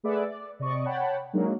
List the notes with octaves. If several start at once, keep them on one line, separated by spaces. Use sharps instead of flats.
A3 G#4 B4 D5 E5 F#5
D5
C3 D5 D#5 C#6
C#5 F#5 G5 A5 B5
F#3 G#3 A#3 D4 D#4